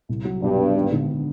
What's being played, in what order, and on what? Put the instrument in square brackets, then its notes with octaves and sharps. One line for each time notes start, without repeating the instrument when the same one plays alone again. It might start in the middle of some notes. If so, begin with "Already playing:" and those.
[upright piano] C2
F#3
[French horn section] G2 [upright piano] B2
[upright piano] B3
G#1
D3